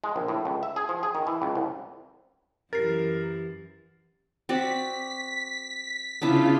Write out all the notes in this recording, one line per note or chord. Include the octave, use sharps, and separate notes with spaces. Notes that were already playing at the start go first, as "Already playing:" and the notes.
G#3
A#1
A2
C#2
E5
G#4
F3
G#4
D#3
E3
C#2
C2
F#2 E3 G4 A#4 A6 C7
C4 F#4 D5 B6
C#3 B3 D4 E4 F4